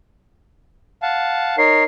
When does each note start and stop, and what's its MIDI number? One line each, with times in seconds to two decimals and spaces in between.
1.02 1.56 77
1.02 1.56 78
1.02 1.56 81
1.58 1.84 63
1.58 1.84 70
1.58 1.84 73
1.58 1.84 96